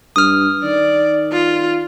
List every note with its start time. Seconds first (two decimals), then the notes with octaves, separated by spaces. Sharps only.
0.16 G2 D#6 F6
0.63 D#3 D5
1.32 F4